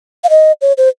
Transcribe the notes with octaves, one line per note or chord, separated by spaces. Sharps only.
F5
D#5
C#5
C5